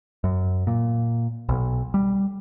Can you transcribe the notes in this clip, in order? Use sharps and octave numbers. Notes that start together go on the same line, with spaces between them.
F#2
A#2
B1
G3